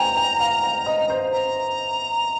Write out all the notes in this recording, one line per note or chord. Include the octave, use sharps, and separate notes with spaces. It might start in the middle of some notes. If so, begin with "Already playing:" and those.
Already playing: G5 G#5 A#5
G5
F5
F5
D#5
C5
A#5